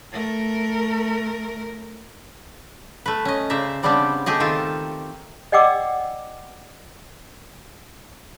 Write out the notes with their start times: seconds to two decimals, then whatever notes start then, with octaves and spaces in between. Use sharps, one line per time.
0.12 A3 A#4
3.06 A3 B4
3.25 C#4 D#5
3.50 C#3 C5 D5 E5 A#5
3.83 C#3 G3 B3 C4 D4 G4
4.26 A3 G4 G#4 D#5
4.40 D#3 C4 F4 A4
5.52 D5 D#5 F#5 G5 D6 E6